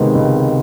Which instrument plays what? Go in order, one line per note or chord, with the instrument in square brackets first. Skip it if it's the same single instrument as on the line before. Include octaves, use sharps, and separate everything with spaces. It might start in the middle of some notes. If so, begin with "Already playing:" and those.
Already playing: [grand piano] C#2 C3 D#3 G#3 B3
C#2